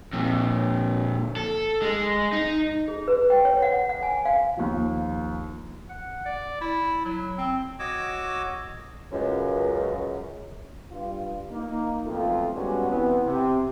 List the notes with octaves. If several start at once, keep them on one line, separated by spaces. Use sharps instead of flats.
F2 A#2
A4
G#3
D#4
G#4
B4
G5
C#5
F#5
F#5
G#5
F5
D#2 F3
F#5
D5
E4
F#3
C4
F#4 C#5 D#5 D6 E6
C#2 F#2
G2 F4
A#3 D#4
B1 F2 A3 F4
G3 G#3 B3 C#4 D4 F#4
E3 B3 C4
C3